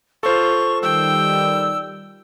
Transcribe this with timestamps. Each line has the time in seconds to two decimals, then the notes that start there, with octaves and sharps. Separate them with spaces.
0.23 F4 A4 C5 C#6
0.83 D#3 G3 G5 E6